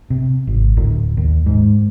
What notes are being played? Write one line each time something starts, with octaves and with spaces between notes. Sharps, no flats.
C3
G#1
D1
D#2
G#2